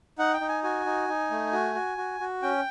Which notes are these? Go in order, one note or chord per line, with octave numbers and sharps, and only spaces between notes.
D#4 F#5
G5
D#4
G#5
F#4 G#5
D#4
D#4
A3
F#4
F#4
F#4
F#4
C#4 G5